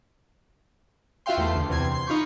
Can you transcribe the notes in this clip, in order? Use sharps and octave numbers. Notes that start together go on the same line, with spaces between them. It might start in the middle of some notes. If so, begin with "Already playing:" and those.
F4 F#4 E5 F5 G5 C6
E2 A3 C6
D2
E2 C3 C6 G#6
C6
D#4 F4 B5 C#6 G6